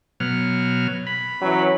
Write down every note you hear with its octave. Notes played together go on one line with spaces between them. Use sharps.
B2 F#3 F6
B5
E3 F#3 C#4